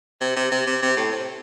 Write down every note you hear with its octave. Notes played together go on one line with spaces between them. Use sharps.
C3
C3
C3
C3
C3
A2
C3